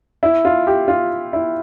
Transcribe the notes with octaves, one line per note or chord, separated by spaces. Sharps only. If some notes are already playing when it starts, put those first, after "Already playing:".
E4
F4
G4
F4
E4